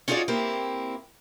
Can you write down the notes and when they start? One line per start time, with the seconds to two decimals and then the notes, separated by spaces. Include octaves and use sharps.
0.08 C#4 D#4 F4 F#4 G#4 D5
0.28 A#3 C4 E4 G4